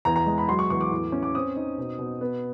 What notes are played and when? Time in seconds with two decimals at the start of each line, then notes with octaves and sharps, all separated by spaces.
0.05 E2 A#5
0.16 A#5
0.26 G#3
0.38 B5
0.49 F#3 C6
0.59 C#6
0.70 E2 C#6
0.81 D6
0.91 A2
1.12 C#4
1.23 D6
1.35 C4 D#6
1.56 D#4
1.78 B2
1.98 B2
2.21 B3